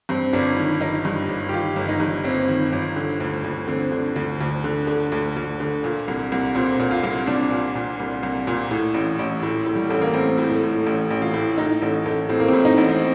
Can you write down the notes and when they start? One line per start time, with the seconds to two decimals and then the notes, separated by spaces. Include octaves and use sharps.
0.09 G2 C4
0.33 G1 D4
0.57 D#3
0.81 G1 D#4
1.05 G2
1.29 G1
1.49 G4
1.53 D#3 F4
1.76 G1
1.89 D#4
2.00 G2
2.24 G1 C4
2.48 D#3
2.73 G1
2.96 D3
3.20 D2
3.44 D2
3.68 D3 C4
3.92 D3
4.16 D2
4.41 D2
4.64 D3
4.87 D3
5.12 D2
5.36 D2
5.60 D3
5.84 A#2
6.08 C2
6.32 C2
6.55 A#2 C4
6.79 A#2
6.91 F4
7.04 C2
7.27 C2 D4
7.50 A#2
7.75 A#2
7.99 C2
8.23 C2
8.47 A#2
8.71 A2
8.94 A1
9.19 A1
9.43 A2
9.66 A2
9.76 G3
9.89 A1 A3
10.01 A#3
10.14 A1 C4
10.38 A2
10.50 A3
10.63 A2
10.86 A1
11.11 A1
11.22 F4
11.34 A2
11.58 A2 D#4
11.82 A1 A3
12.06 A1 A3
12.29 A2 C4
12.40 A#3
12.48 A2 C4
12.65 D#4
12.78 A1
12.89 C4